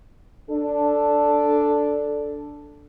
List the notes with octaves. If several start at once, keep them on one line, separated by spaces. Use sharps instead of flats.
D4 A4